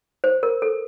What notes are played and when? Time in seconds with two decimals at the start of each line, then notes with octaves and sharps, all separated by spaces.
0.24 C5
0.43 A#4
0.62 A4